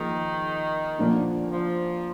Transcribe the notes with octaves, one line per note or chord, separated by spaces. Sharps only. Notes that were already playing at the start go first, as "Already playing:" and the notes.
Already playing: D#3 F3 A#3 F4 G#4
A#2 D3 F3 A#3 D4 F4
F3